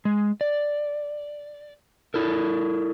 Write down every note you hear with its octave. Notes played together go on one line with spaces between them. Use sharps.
G#3
D5
E4 A4 A#4